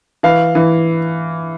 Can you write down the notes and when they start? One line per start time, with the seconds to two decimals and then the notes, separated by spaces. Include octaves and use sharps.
0.23 E3 F5
0.55 E3